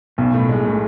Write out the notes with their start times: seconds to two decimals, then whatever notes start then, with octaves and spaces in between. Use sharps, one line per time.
0.18 B1 B2
0.34 A2
0.49 G#3
0.66 A2